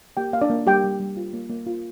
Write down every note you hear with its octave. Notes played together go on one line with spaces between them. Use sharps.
A#3 G4 G5
A#3 F5
D4 D5
A#3
G3 G4 G5
G3
G3
F4
A#3
A#3
F4